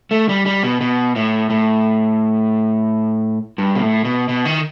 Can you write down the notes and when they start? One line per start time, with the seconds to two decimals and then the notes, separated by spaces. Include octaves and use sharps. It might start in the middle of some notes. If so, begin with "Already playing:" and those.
0.11 A3
0.29 G3
0.46 G3
0.63 B2
0.81 B2
1.16 A2
1.50 A2
3.58 G2
3.75 B2
3.82 A2
4.05 B2
4.29 B2
4.45 D#3